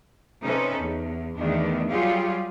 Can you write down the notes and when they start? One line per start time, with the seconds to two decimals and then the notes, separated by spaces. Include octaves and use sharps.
0.43 C3 C#4 D#4 A4 B4
0.79 E2
1.37 E2 D#3 A3 D4
1.90 F#3 G3 F4 G4 G#4 F5